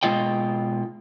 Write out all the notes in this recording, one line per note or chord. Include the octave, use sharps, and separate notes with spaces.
B2 G#3 F4 D#5 G5